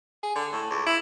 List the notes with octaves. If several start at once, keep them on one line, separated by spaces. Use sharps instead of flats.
G#4
D3
A2
C#2
E4